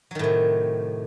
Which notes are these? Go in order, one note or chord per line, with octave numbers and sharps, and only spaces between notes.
A2 C3 D#3 F#3